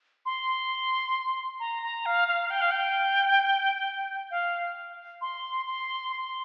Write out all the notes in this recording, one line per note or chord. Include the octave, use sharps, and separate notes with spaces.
C6
A#5
A#5
F5
F5
G5
F5
G5
F5
C6
C6
C6